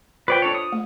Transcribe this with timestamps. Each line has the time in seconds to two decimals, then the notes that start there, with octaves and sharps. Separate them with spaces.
0.28 F4 B4 C5 D5 G5 C#6
0.42 D4 A4 C#5
0.55 D#6
0.72 A3